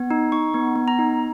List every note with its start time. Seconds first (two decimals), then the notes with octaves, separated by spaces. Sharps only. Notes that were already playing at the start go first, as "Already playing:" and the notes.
Already playing: B3
0.10 D#4
0.32 D#4 C#6
0.54 B3
0.76 B3
0.88 A#5
0.99 D#4